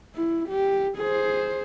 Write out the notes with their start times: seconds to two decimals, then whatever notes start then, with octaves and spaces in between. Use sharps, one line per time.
0.15 E4
0.48 G4
0.98 G#4 C5